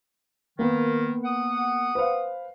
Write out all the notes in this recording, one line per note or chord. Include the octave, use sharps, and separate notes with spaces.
D#3 A#3 B3
F#5 D#6
B4 C5 F5